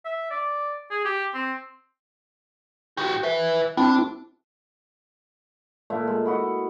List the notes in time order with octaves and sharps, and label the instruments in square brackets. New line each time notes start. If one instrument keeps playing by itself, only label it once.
[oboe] E5
D5
G#4
G4
C4
[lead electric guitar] F#4 G4
B4 E5
[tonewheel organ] C4 E4 [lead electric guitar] D4
[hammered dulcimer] A#2 A3 E5
G#3
E4 F#4 D#5